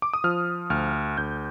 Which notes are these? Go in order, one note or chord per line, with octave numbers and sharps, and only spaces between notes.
D6
D#6
F3 F6
D2 F6
D2 G6